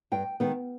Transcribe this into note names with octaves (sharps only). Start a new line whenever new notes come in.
G2 G5
D#3 G#3 B3